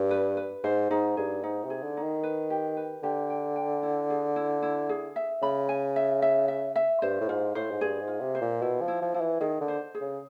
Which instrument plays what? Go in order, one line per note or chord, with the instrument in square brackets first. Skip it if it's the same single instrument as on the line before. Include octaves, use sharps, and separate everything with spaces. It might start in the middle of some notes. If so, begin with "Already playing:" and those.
Already playing: [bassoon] G2
[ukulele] B4
B4
[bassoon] G#2 [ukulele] C5
[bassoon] G#2 [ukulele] D#4
[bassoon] G2 [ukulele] G#4
[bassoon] G#2 [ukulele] D#4
[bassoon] C3
[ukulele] G#4
[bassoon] D3
[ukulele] D#4
[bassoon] D#3
[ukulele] B4
G4
B4
[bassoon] D3 [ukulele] G4
[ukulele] G5
G5
E4
G#4
E4
E4
G#4
E5
[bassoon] C#3 [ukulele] B5
[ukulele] G#5
E5
E5
E5
E5
[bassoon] G2 [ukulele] C5
[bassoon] A2
[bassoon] G#2 [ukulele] F4
[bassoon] A2 [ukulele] C5
[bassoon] G#2
[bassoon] G2 [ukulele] G#4
[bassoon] G#2
[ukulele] F4
[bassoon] C3
[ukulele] C5
[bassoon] A#2
[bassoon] B2 [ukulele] E4
[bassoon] F3
[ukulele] E4
[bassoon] F3
[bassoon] F3 [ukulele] E4
[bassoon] E3
[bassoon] D#3 [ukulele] G#4
[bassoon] D3
[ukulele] C5
G#4
[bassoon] C#3